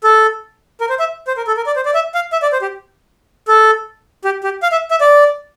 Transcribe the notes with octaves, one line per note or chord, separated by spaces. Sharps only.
A4
A#4
C5
E5
C5
A#4
A4
A#4
D5
C5
D5
E5
F5
E5
D5
C5
G4
A4
G4
G4
F5
E5
E5
D5